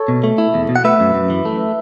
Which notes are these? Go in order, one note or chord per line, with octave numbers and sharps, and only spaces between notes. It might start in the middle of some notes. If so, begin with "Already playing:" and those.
Already playing: A4 C#5
B2
A3
E4
E2
B2
F#5
A3 B4 E5
F#2
F#2
E3
A3